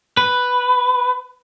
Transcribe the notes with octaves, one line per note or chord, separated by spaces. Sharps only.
B4